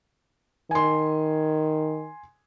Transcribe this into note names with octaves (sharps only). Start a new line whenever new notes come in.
D#3 G#5 C6